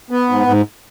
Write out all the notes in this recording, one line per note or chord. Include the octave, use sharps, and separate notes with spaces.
B3
G#2
G#2